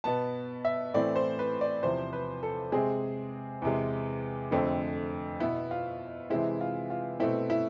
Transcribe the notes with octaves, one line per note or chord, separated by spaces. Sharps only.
B2 B3 A5
E5
A2 E3 A3 C4 D5
C5
B4
D5
E2 C3 F3 C5
B4
A4
C3 G#3 C4 G#4
E2 C3 G#3
F2 D3 A3 C4
B2 B3 E4
F4
C3 E3 G#3 C4 E4
F4
F4
B2 A3 C4 E4
E4